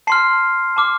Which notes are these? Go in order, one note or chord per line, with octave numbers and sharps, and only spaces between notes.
A5 C6 F6 C7
A5 D6 F6